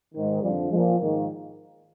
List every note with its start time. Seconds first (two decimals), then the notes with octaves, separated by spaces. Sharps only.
0.14 G#2 D#3
0.42 F2 D3 F3 G3
0.70 F3 G#3
0.75 A#2
0.99 G#2 D#3 A#3